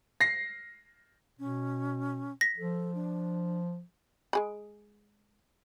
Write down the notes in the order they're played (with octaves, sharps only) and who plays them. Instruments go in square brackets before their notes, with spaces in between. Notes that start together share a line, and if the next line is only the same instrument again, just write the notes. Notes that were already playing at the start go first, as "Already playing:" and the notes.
[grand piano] A#6 C7
[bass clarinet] B2 [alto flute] C#4
[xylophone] A#6 B6
[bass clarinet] F3 [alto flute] A4
[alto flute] D4
[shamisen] G#3 G#4 B5